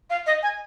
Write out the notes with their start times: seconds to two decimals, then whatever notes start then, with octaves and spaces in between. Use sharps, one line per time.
0.10 F5
0.26 D#5
0.43 G#5